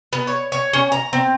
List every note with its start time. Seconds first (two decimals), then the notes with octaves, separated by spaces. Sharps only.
0.13 B3
0.27 C#5
0.52 C#5
0.73 C#4
0.92 A#5
1.13 C4